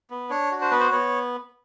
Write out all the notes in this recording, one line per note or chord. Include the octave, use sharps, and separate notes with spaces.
B3
D4 C#5
F#4
C5
B3 B4
C5
B3 C#5